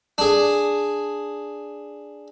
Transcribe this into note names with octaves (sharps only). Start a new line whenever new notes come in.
D4 G#4